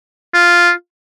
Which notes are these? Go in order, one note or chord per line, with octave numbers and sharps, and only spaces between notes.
F4